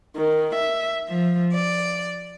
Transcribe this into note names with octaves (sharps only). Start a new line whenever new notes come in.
D#3
E5
F3
D5